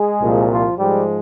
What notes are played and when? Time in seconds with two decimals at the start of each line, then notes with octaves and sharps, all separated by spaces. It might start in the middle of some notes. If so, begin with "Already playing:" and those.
Already playing: G#3 G#4
0.21 C2 A#2 F3
0.49 F3 F4
0.77 G#2 F3 G3 G#3 G4